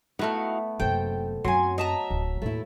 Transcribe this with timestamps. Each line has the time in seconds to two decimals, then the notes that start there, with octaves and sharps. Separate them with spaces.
0.19 A3 B3 D#4 E4 F#4 F5
0.80 F#1 C3 A4 C5 G5
1.44 F#2 F#3 C4 G#5 C6
1.78 F#4 D#5 E5 A5 A#5
2.10 D1
2.42 D#2 A2 A3 E4